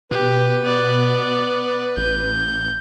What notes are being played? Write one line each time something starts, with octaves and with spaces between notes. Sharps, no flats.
B2 G4 B4
B3 D5
A1 G6